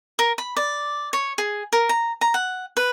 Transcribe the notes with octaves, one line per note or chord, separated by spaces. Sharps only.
A#4
B5
D5
C#5
G#4
A#4
A#5
A#5
F#5
B4